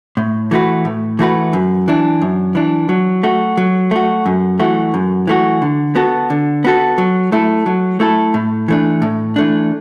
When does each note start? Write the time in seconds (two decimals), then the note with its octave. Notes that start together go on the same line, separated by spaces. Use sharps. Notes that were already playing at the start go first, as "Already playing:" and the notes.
0.17 A2
0.51 E3 A3 F#4 B4
0.85 A2
1.19 E3 A3 F#4 B4
1.53 F#2
1.88 E3 D4
2.22 F#2
2.55 E3 D4
2.89 F#3
3.23 A3 F#4
3.57 F#3
3.91 A3 F#4
4.26 F#2
4.59 E3 A3 F#4
4.94 F#2
5.27 E3 A3 F#4
5.62 D3
5.96 B3 F#4 A4
6.30 D3
6.64 B3 F#4 A4
6.98 F#3
7.32 A3 E4 A4
7.66 F#3
8.00 A3 E4 A4
8.34 A2
8.68 E3 A3 D4
9.02 A2
9.36 E3 A3 D4